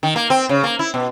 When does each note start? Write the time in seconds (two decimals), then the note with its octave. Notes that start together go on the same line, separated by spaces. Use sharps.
0.03 D#3
0.16 A#3
0.30 C4
0.49 C#3
0.64 A#3
0.79 E4
0.94 B2